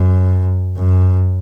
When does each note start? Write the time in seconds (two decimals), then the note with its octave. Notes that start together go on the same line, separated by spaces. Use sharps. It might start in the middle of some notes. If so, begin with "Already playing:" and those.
Already playing: F#2
0.77 F#2